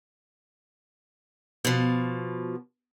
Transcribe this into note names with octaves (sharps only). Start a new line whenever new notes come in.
B2 F3